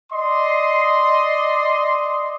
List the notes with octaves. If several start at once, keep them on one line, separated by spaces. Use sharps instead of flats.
D5 D#5 C6